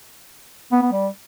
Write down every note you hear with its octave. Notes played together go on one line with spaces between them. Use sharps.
B3
B3
G3